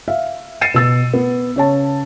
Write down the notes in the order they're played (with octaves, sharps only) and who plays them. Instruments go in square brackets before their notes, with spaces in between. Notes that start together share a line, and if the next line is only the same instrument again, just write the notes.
[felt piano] E5 F5
A6 C7 C#7 D#7 E7
B2 E6 A6
B3
C#3 C#5 A5